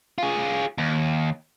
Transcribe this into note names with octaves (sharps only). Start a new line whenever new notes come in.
F4 G#4
D#2